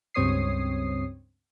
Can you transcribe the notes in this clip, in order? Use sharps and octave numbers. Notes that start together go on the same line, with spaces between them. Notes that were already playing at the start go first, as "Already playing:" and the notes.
C#2 G2 C4 C#5 D#6 C7